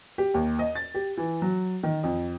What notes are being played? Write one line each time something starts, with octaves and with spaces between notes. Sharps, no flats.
G4
D#2
D#5
A6
G4
E3
F#3
D#3
F2